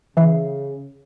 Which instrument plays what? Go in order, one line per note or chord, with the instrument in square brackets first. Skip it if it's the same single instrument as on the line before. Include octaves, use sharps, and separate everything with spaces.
[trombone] C#3 [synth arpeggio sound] E3 E5 C7